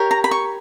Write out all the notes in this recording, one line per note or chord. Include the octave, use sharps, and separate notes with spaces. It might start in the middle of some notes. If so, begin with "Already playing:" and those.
Already playing: G4 A#4 C#5
A#5
B5
C#6